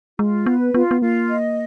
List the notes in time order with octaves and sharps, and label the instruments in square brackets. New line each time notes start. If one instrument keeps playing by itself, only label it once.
[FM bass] G#3 [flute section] F4
[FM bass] B3 [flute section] B4
[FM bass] B3 [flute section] F4
[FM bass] B3
[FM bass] A#3 [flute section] F4
[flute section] D#5